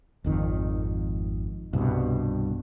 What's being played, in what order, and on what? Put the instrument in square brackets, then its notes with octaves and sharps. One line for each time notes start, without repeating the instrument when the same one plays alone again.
[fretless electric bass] G#1 F2 D#3
C2 G2 B2